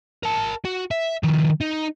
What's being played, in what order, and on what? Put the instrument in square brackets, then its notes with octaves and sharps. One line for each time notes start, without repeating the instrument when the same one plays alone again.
[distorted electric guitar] A#4 A5
F#4
E5
D#3 F3
D#4